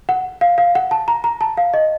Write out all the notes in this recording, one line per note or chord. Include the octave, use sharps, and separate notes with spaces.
F#5
F5
F5
F#5
A5
A#5
A#5
A5
F5
D#5